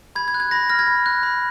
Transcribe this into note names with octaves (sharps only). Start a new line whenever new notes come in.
B5 G#6
G#6
F#6
G#6
B5 A#6
F6 A#6
G#6
B5
F#6
B5